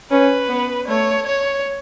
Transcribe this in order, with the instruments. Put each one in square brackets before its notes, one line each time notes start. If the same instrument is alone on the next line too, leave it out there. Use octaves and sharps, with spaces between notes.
[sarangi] C#4 [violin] B4
[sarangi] B3
[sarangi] A3 [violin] C#5
[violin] C#5